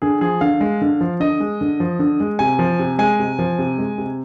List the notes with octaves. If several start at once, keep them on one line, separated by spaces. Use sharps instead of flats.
D3 G#4
F3 G#4
D3 F5
G#3
D3
F3
D3 D#5
G#3
D3
F3
D3
G#3
C3 G#5
F3
C3
G#3 G#5
C3
F3
C3
G#3
C3